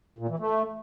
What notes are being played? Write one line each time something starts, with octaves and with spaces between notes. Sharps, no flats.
A#2
E3
A3